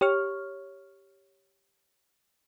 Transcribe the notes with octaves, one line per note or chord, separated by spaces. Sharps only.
G4 C#5 C#6 F6